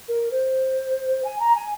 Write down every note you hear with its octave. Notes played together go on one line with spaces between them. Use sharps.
A#4
C5
G#5
A#5
G#5